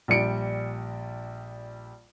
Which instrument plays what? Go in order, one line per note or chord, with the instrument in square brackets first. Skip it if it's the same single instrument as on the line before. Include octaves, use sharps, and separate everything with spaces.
[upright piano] A#1 G3 C#7 D7